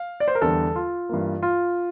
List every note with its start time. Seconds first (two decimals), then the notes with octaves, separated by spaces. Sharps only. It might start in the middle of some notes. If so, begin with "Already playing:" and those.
Already playing: F5
0.20 D5
0.28 C5
0.35 A#4
0.42 E2 D3 G3 A4
0.76 F4
1.09 G2 E3 A#3
1.42 F4